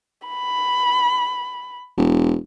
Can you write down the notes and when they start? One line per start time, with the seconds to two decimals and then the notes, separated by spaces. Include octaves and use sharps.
0.28 B5
1.97 E1